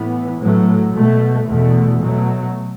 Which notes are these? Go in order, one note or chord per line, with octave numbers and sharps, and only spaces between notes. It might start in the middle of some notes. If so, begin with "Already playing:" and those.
Already playing: A2 E3 B3
A2 F#3 A3
B2 A3
E2 B2 A3
B2 F#3 A3